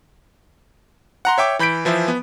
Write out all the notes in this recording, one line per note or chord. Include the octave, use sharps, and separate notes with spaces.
F#5 A#5 C6
C#5 E5 G5 D6
E3 B5 G6 B6 D7
E3 F3 C5 E5
B3